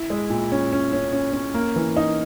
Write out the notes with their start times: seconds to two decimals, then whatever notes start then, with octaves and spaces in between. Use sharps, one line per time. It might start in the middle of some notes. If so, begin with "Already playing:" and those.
Already playing: E4
0.10 G#3
0.30 A#2
0.52 C#4
0.72 C#4
0.93 C#4
1.13 C#4
1.33 C#4
1.54 A#3
1.76 E3
1.97 D#4